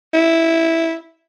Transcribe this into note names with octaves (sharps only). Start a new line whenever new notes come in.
E4